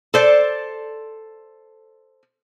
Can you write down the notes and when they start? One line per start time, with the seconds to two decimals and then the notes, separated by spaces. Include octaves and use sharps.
0.14 A4 C5 D5